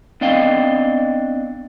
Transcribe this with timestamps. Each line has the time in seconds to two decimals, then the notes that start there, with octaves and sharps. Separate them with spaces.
0.21 B3 C4 D4 D#5 F5 G5